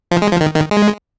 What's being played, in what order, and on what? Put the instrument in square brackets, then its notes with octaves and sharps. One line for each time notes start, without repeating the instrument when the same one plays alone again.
[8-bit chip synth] F3
G#3
F3
D#3
D#3
G#3